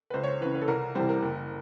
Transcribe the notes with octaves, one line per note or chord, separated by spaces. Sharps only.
B4
C#2 C5
C#5
C5
C#3 E3 B4
B4
A4
C2 A#4
C3 E3 G3 C5
A#4
F#1